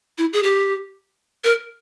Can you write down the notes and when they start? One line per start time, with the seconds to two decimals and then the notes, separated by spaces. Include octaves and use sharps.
0.18 E4
0.33 G#4
0.43 G4
1.44 A#4